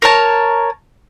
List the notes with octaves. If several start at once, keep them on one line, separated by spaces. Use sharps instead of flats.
A#4 C#5 A5